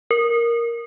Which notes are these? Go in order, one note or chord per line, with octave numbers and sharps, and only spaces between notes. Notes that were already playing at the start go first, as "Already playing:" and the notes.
A#4